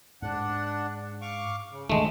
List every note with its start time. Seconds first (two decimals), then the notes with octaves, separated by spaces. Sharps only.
0.22 G#2 D4 F#5
1.22 F5 C#6 D6
1.71 C#3
1.90 D3 D#3 G#3 A3 D4